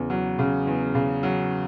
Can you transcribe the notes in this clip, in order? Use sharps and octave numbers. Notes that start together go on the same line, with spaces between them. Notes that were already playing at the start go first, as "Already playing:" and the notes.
Already playing: E2 C#3
F#3
C#3
E2
C#3
F#3